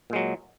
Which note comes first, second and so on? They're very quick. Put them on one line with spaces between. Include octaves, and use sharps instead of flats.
A#2 G#3 F#3